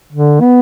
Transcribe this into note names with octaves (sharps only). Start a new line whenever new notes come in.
D3
B3